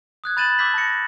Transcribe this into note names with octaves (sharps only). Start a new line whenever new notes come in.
D#6 F#6 G#6
B5 G6 A6 D#7 E7 F#7
D6 E6 G6 B6 F#7
A5 A#6 C#7